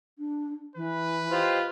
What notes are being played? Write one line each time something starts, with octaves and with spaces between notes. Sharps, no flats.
D4
E3 B4
F4 G4 C5 D#5